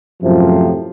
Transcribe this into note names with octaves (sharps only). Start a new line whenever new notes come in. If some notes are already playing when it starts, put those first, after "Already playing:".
F#2 A2 C3 F3